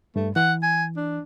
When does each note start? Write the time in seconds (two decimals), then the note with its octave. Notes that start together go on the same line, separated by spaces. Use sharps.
0.16 G2 A3
0.36 E3 F#5
0.63 G#5
0.97 D4